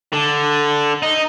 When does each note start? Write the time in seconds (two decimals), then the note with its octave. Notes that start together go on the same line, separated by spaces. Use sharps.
0.13 D3
1.02 D#4